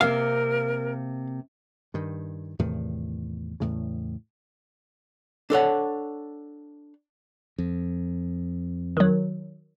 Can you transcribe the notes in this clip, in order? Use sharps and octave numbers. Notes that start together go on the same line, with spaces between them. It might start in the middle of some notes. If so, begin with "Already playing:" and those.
C3 A#3 A#4 F5
G2 D#3
E2 A2 C3 D#3
E2 A2 C#3
D4 A4 C#5 F#5
F2
D#3 F#3